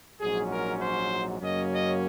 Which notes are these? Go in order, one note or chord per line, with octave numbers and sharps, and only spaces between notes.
A#1 G#2 F#3 C#4 G#4
A#4
C5
F#2 C#3 F#3 A#3 C#4 D#5
D#5